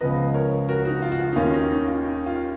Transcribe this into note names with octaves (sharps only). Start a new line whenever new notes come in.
C#2 C#3 F3 B3 B4 D#5
A#4 C#5
F#4 A#4
D#4 F#4
F4
F#4
F4
D#4
D#2 D#3 A#3 C#4 F4
D#4
D#4
F4
D#4
F4